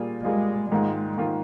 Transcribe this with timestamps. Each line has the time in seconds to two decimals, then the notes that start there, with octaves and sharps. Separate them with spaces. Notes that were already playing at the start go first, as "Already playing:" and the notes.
Already playing: A#2 G3 A#3 F4 G#4
0.24 A#2 G3 G#3 A#3 F4 G#4
0.71 G#2 D#3 G#3 A#3 F4
1.18 G#2 D#3 A#3 F4